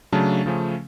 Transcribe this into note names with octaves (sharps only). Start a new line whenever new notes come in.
C#3 F#3 A3 D4 A5
C#3 F3 A3 C#4